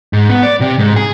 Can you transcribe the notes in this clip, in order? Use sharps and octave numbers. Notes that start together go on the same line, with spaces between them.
G#2
B3
D5
C3
G#2
G#4